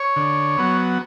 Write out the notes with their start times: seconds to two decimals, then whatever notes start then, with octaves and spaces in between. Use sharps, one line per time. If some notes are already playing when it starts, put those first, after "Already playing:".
Already playing: C#5
0.16 D3
0.58 F#3 B3